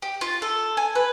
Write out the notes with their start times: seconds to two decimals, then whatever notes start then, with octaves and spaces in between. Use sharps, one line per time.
0.02 G4
0.21 F4
0.42 A4
0.77 G#5
0.95 B4